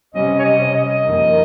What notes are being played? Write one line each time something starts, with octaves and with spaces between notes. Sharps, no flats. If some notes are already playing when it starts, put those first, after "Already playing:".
C3 G3 C#4 D#5
C#5
D#5
D#5
F2 D#3 G3 A#3